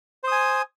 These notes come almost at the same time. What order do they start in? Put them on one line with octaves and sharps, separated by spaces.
C5 D#6 G#5